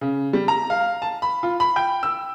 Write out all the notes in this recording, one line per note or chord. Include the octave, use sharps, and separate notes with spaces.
C#3
G3
A#5
F5
A5
B5
F4
B5
G5
E6